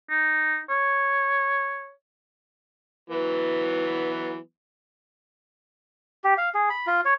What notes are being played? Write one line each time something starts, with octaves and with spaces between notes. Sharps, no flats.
D#4
C#5
E3 F#3 B3
G4
F5
G#4
B5
F4
C#5